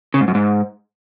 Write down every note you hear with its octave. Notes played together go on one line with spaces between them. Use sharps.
C#3
G#2
F#2
G#2